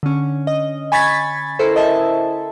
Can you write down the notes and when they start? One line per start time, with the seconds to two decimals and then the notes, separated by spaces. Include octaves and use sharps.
0.03 D3 C#4
0.47 D#5
0.92 G#5 B5 C#6 G#6 A6 B6
1.59 E4 A4 A#4 C5
1.76 D#5 E5 A5